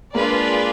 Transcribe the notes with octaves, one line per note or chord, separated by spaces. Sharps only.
G#3 A#3 D4 F4 G#4 B4 D5